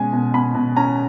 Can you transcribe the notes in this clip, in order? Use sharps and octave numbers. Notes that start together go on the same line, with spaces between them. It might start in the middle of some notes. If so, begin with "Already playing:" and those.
Already playing: B2 G#3 C#4 G#5
B2
B2 B5
B2
C#4 A#5